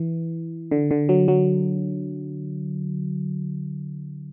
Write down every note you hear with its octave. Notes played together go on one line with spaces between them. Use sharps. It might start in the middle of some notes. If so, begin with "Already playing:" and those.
Already playing: E3
D3
D3
F#3
F#3